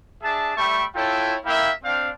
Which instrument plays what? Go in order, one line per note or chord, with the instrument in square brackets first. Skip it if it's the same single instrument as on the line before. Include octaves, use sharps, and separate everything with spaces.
[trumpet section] D4 G#4 E5 A5
G3 A3 E5 G5 B5 C#6
E4 F4 A4 C#5 G5
A#3 E4 A#4 E5 F5 G5
C4 D4 F5